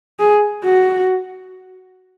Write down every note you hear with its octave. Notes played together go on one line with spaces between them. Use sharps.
G#4
F#4